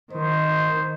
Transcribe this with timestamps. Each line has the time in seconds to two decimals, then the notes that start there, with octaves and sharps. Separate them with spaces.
0.12 D#3 C5